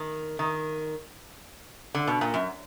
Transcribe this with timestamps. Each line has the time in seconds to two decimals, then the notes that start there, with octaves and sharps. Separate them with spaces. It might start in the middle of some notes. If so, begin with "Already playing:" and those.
Already playing: D#3
0.39 D#3
1.95 D3
2.07 B2
2.21 A#2
2.34 F#2